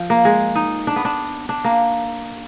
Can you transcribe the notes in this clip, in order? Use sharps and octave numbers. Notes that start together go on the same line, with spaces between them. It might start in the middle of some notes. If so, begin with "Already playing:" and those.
Already playing: F3
A#3
G#3
D#4
D4
B3
D4
D4
A#3